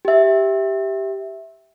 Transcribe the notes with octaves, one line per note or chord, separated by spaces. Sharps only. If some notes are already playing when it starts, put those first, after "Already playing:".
G4 E5